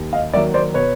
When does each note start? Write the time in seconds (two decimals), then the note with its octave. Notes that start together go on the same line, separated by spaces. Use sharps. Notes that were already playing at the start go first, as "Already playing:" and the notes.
Already playing: D#2
0.13 D#5 F5
0.33 D#3 F#3 A#3 D5 E5
0.54 C5 D5
0.74 B2 B4 C#5